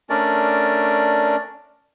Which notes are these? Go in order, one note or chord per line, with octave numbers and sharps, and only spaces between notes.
A3 C#4 D4 A#4 D5